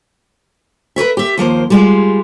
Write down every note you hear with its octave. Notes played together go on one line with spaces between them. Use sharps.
A#4 B4 C#5 E5
G4 E5
D#2 F3 A#3 C5
G3 G#3 F4